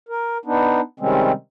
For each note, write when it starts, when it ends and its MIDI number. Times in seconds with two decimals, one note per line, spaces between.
0.09 0.38 70
0.45 0.81 59
0.45 0.81 62
0.45 0.81 63
1.00 1.32 48
1.00 1.32 51
1.00 1.32 55
1.00 1.32 56
1.00 1.32 60
1.00 1.32 61